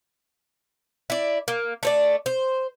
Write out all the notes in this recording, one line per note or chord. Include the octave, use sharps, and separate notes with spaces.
E4 D5
A#3
A3 C5 D5
C5